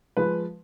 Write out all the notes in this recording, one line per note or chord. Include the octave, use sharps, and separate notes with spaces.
F3 G#3 B4